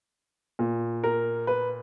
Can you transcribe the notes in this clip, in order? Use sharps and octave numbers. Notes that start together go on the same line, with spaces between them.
A#2
A#4
B4